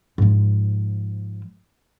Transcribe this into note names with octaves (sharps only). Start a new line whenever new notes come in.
G#2 F3